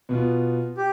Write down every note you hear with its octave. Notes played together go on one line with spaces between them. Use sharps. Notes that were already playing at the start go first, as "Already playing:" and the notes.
B2 B3 F4
G4